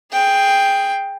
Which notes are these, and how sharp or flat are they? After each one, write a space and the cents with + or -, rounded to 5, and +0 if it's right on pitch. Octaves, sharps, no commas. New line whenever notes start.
G#4 +5 G5 +10